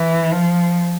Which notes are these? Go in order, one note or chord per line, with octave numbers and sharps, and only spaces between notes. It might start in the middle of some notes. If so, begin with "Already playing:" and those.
Already playing: E3
F3